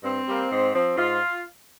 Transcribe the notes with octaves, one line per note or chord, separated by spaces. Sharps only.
G2 C4
G3 A#3
G#2
F3 C4
G#2 F4